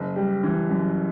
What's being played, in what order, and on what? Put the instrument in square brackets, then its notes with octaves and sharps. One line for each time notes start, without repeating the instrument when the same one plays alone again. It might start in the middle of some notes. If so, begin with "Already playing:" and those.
Already playing: [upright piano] F#1
G3
E3
F#2